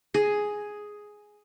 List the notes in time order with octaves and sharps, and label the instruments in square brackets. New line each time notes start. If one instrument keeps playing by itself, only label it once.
[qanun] G#4